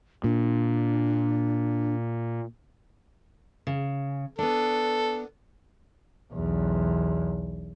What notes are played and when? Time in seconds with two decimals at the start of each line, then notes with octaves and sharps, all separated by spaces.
0.24 A#2 D4
3.67 C#3
4.39 B3 D4 A4
6.33 B1 E2